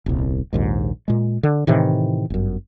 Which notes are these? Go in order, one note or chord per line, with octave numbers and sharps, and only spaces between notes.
D#1 C2
A#1 D#2 G#2
A#2 G#3
D3
A2 C3 D#3 E3
G1 F#2